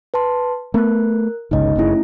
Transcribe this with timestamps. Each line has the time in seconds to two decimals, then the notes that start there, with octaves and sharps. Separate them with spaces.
0.14 B4 A5 C6
0.74 A3 B3 A#4 F#6
1.51 G1 C#2 C#3 D#4 D#5
1.76 F#1 C#3 A3 C#4 E4